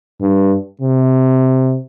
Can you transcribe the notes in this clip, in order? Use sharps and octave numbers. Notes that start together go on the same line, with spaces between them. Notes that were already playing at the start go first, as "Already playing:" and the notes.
G2
C3